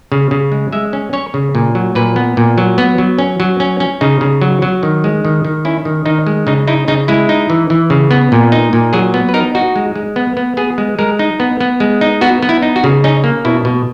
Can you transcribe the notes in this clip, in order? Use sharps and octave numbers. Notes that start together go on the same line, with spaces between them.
C#3
C#3
G#3
G#3 E5
C#4
C#4 C#5
C#3
A#2
F#3
A#2 B4
B3
A#2
F#3
B3
F#3
C#4
F#3
C#4
C#4
C#3 D#4
C#3
F#3
F#3
D#3
G#3
D#3
D#3
C#4 E4
D#3
D#3 D#4
G#3
C#3 D#4
D#4 E4
C#3 D#4
G#3 E4
D#4
E3
E3
C#3
B3
A#2
D#4
A#2
F#3 G#4
B3
B4
D#4 A#4
D#4 F#4
G#3
G#3
B3
B3
B3 G#4
G#3
G#3 A#4
D#4
B3
B3
G#3
D#4
B3 F#4
B3
E4
D#4
F#4
C#3
C#4 D#4
A#3
B2 E4
B2